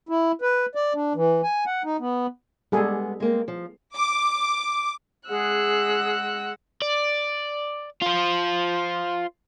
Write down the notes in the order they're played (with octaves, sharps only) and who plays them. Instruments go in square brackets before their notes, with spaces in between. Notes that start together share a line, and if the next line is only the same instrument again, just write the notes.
[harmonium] E4
B4
D5
D4
E3
G#5
F#5
D#4
B3
[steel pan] G3 G#4 A4 [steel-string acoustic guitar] G#3 B3
[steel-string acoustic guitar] G#3 A#3 C4
F3
[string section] D6
[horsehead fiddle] G#3 F#5 [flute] G#4 [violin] E6 F#6
[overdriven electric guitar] D5
F4 C5